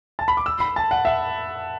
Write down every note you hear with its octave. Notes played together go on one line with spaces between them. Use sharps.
A5
B5
D6
E6
B5
A5
F#5
E5